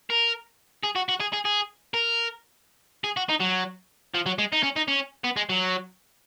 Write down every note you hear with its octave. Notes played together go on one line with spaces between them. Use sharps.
A#4
G#4
F#4
F#4
G#4
G#4
G#4
A#4
G#4
F#4
D#4
F#3
F3
F#3
G#3
D#4
C#4
D#4
C#4
B3
G#3
F#3